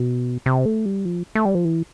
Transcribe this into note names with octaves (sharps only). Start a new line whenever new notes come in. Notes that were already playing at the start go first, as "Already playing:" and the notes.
Already playing: B2
C3
A3
G3
F3
A3
G3
F3
E3